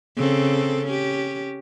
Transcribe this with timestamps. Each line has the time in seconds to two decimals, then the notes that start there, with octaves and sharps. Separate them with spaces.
0.16 C#3 C4 A4
0.86 C#4 G4